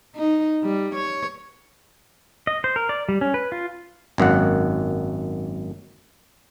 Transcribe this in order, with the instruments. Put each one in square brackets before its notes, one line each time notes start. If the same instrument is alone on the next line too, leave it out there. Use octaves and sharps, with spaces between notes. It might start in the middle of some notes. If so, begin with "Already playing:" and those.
[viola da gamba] D#4
G3
C#5
[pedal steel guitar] D#5
C5
A#4
D5
G3
C#4
B4
F4
[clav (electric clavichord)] G#1 F#2 A#3 F#5